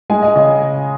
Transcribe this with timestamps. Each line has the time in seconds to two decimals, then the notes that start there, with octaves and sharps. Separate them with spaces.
0.10 G#3 G#5
0.22 D#5
0.35 C#3 D#5